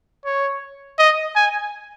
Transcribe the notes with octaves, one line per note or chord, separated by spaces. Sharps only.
C#5
D#5
G#5